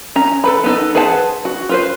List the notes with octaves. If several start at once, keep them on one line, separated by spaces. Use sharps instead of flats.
C#4 A#5
A4 B4 B5
B3 D#4 A4
G#4 B4 C5 F#5 A5
F#4
F4 B4 C5